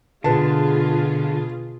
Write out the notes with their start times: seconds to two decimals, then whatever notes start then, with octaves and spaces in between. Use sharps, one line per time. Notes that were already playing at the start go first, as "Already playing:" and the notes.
0.24 B2 D3 F4 G#4 B4 A5